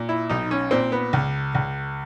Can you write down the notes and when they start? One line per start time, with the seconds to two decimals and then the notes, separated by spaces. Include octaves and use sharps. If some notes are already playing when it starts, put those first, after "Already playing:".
Already playing: A#2
0.09 E4
0.30 B1 D#4
0.51 C#4
0.71 A#2 C4
0.92 B3
1.13 C#2
1.55 C#2